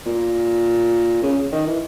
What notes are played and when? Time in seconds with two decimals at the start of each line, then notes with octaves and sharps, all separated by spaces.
0.06 A#2
1.23 C#3
1.52 D#3
1.67 E3